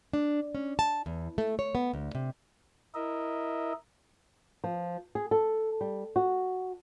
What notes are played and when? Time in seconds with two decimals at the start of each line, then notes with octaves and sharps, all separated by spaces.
0.13 D4
0.55 C#4
0.79 A5
1.06 E2
1.38 A3
1.59 C#5
1.75 B3
1.94 D2
2.15 C3
2.94 E4 A#4 D#5 E5
4.64 F3
5.15 G#4
5.31 A4
5.81 G3
6.16 F#4